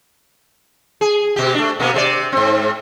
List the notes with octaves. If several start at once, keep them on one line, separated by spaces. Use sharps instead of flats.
G#4
B2 G4
A3 D4
B2 A#3 B3
C3 A4 D5
G#2 C4